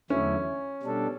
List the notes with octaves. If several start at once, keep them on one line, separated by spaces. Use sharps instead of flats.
E2 D3 F#3 A3 C#4 E4
B2 G3 D4 A4